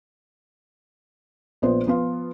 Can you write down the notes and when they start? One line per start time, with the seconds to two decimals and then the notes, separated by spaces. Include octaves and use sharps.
1.62 A#1 B3 C5
1.86 F3 B3 F4